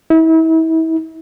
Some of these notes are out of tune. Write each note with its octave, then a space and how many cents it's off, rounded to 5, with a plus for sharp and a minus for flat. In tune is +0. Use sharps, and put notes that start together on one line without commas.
E4 -35